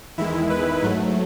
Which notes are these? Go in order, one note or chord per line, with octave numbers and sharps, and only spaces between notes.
E2 D#3 G#3 E4
B4
G#2 F#3 A3